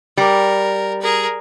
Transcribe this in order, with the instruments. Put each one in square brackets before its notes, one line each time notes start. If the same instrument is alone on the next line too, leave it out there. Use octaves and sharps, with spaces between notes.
[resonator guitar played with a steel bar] G3 [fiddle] A#4
[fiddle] G#4 A#4